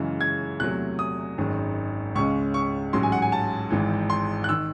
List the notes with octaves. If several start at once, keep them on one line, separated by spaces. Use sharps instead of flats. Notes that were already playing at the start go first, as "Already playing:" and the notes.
Already playing: F#2 C#3 E3 G#3
G#6
E2 C3 F#3 A3 F#6
D#6
G#1 F#2 D#3 G#3
C#2 C#3 G#3 C#4 C#6
C#6
A1 G#2 F#3 C#4 C6
G#5
F#5
G#5
A5
G#1 G#2 E3
C6
F#6
D#3 E6